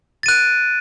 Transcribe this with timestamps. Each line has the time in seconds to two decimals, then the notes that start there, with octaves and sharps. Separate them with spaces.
0.23 A6
0.26 D#7
0.28 F#6
0.31 D7